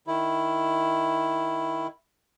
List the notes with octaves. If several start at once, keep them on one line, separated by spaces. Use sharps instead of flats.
D#3 E4